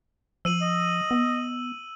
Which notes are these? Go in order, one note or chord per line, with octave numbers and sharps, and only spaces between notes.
F3 E6 D#7 F#7
D#5
B3